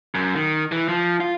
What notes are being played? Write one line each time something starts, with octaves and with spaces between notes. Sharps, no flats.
F#2
D#3
E3
F3
F4